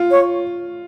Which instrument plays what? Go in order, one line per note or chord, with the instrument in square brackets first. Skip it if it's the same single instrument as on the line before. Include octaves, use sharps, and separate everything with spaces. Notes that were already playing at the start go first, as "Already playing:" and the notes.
Already playing: [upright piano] F4
[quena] C#5